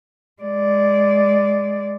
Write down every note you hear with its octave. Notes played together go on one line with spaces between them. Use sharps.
G#3 D5